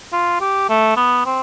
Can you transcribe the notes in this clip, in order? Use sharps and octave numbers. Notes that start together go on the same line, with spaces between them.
F4
G4
A3
B3
C4